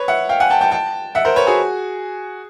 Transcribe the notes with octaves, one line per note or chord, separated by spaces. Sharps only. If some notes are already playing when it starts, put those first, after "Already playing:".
Already playing: B4 C#5
E5 F#5
F5 G5
F#5 G#5
G5 A5
G5 A5
G5 A5
E5 F#5
A#4 C5
B4 C#5
F#4 G#4